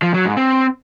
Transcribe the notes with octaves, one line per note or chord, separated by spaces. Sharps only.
F3
F#3
G#2
C4